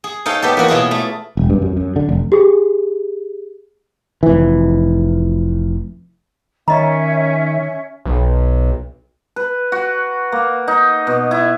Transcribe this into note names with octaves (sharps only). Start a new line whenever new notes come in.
G#4
D#4 A4 C#5 F5 G5
B3 G4 A4
E3 A#3 F#4 A#4
B2 E4 F4 G#4
A3
E1
G2
F#2
F#2
D3
F1
G4 G#4
F1 E3
D#3 C#4 D#5 E5 A#5
B1
B4
F#4
A#3
D#4
B2
E4